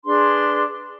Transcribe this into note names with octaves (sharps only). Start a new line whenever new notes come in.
D4 G#4 B4 C6